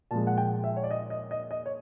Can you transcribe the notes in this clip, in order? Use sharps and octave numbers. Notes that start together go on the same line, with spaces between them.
A#2 F3 G#3 A5
F#5
G5
E5
C#5
D5
D#5
D#5
D#5
D#5
C#5